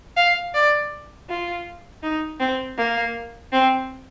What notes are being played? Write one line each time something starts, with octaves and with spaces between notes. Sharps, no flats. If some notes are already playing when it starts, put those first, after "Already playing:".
F5
D5
F4
D#4
C4
A#3
C4